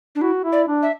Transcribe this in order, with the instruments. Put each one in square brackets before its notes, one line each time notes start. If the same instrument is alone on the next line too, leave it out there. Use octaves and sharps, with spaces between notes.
[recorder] D4
[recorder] E4 [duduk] F#4
[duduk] E4
[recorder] D5
[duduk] D4
[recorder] E5